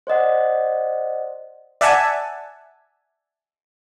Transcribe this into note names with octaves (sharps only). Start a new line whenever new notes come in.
C5 D5 D#5 F#5
D5 E5 F#5 G#5 A5